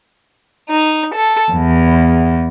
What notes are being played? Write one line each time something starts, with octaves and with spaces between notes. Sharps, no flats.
D#4
A4
E2